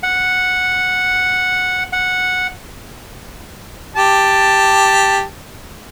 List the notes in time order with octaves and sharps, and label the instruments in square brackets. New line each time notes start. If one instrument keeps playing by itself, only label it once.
[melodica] F#5
F#5
[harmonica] G4 A5